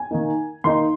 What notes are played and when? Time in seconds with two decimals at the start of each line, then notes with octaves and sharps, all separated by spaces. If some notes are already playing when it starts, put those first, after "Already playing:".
Already playing: G#5
0.11 D#3 A#3 D#4
0.64 D#3 A#3 D#4 C6